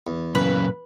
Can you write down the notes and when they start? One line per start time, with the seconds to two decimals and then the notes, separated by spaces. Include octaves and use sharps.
0.07 E2
0.35 F#2 A#2 C#3 B4